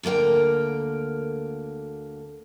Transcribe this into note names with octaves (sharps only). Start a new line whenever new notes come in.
D2 D3 A#3 A#4 G5